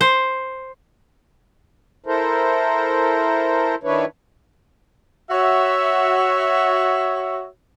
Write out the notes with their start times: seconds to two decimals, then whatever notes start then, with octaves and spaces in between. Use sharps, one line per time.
0.01 C5
2.06 E4 A4 A#4 C5
3.83 D#3 D4 E4 B4 C#5
5.31 F#4 C#5 E5